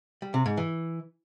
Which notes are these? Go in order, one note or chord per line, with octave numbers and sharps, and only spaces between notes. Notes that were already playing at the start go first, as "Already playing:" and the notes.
G3
C3
G#2
E3